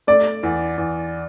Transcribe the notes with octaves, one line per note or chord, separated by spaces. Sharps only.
A3 D5
E2
E2